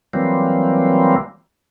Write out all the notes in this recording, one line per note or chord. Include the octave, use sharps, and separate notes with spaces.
E3 F#3 G3 A#3 C4